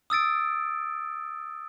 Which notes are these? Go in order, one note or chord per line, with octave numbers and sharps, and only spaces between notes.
D#6 E6 A6 D7